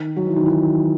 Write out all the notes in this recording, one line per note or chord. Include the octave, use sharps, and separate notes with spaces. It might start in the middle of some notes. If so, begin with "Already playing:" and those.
Already playing: D#3
F#3
E3
D#3
E3